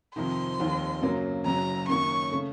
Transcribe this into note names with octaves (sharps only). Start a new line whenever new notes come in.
F2 C3 D#3 C6
F1 D#2 D#3
F#2 C#3 F#3 A#3
F#1 F#2 C#3 F#3 A#5
F#2 D#3 A#3 C#4 C#6
C#3 A3